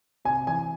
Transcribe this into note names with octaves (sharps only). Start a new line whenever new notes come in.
C3 G#5
E3 G#5